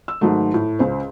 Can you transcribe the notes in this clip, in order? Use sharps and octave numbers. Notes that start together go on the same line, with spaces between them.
E6
G#2 D#3 F#3 A3
A2
C#2 C5